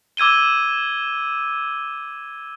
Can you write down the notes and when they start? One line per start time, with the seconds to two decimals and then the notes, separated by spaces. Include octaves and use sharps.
0.17 D6 E6 G#6 D#7 G7